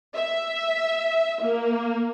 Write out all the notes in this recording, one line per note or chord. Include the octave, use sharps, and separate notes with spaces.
E5
A#3